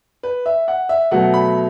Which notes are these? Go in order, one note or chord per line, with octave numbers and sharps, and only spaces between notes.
B4
E5
F#5
E5
B2 F#3 A3 F#5
B5